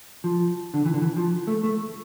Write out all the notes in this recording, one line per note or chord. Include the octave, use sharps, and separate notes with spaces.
F3
D3
E3
D3
E3
F3
A3
A3